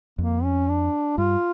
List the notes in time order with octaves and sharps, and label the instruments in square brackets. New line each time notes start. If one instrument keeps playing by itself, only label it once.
[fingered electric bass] F2 [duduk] A#3
[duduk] C#4
D4
[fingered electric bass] G2 [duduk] F4